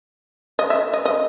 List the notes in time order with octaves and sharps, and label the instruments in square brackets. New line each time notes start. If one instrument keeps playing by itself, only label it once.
[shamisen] D#5
E5
D#5
D#5